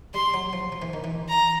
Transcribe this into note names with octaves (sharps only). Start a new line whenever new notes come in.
G3 C6
F#3
F3
F3
E3
D#3
E3
A#5